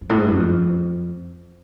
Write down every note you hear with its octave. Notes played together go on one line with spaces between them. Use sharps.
F2
A2
G#2
G2
F#2
F2